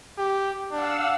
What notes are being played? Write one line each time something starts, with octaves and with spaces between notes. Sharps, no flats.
G4
D4 F5 F#5 E6